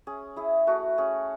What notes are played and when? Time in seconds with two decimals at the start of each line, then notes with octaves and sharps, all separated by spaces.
0.07 C#4 G#4
0.36 E4 G#4
0.67 A3 F#4
0.98 C#4 G#4